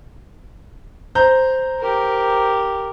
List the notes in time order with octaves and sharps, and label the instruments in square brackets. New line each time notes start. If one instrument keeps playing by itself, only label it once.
[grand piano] C5 A#5 G6
[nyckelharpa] G4 A#4